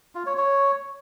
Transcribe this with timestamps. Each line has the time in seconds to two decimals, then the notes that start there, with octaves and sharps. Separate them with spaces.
0.15 F4
0.26 C#5
0.37 C#5